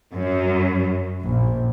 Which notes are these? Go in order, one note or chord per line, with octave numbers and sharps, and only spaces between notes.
F#2
A#1